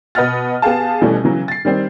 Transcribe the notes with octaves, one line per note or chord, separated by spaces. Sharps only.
B2 B4 D#5 F#5 F6 A6
B3 G4 G#4 F5 A5
B2 E3 G3 A3 C#4
C#3 E3 F#3
A6 C7
D#3 G3 C4